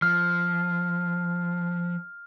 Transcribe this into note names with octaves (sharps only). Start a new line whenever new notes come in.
F3 F6